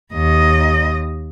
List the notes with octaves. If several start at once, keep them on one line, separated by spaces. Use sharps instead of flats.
D#2 D#5